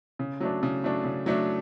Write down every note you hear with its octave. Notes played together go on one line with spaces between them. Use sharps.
C#3
F#3 A3 D4
C#3
F#3 A3 D4
C#3
F#3 A3 D4